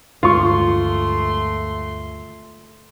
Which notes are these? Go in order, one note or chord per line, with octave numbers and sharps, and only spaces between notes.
D2 G2 G#3 A3 F4 C6 C#6